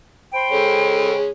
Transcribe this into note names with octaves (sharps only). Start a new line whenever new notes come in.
C5 G5 B5
G#3 C#4 A4
G#4